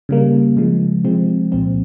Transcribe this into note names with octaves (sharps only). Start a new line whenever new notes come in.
C#3 G3 A#3
C#3 F3 G#3
C3 F3 G#3 C4
C2 A#2 F3 C4